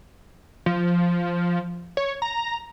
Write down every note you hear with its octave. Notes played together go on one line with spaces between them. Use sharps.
F3
C#5
A#5